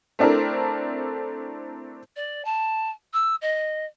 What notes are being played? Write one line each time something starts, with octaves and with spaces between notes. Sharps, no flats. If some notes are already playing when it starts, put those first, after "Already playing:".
A3 C4 D4 E4 A#4
D5
A5
E6
D#5